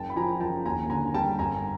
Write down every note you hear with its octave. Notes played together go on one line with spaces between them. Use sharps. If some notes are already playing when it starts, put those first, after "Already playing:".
Already playing: F#1 G5 A5
B5
F3 G#5 A#5
F#1 G5 A5
D#2 G#5 A#5
D3 G#5 A#5
G3 G5 A5
G1 G#5 A#5